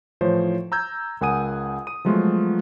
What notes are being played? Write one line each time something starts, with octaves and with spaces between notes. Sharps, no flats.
A2 E3 F3 C5 C#5
A#5 E6 G6 G#6
C#2 A#4 F#5 G#5 D#6 D#7
D#6 D#7
F3 F#3 G#3 A3 B3 F4